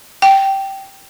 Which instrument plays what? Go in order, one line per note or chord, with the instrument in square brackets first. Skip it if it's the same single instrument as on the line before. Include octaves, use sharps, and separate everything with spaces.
[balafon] G5